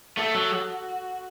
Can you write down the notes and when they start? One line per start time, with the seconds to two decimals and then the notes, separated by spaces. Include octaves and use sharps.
0.17 A3 A4
0.34 F#3
0.53 F#4